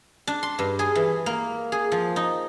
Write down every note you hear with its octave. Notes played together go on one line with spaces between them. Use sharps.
D4
C6
G2
G#4
E3
A#3
G#4
F3
D#4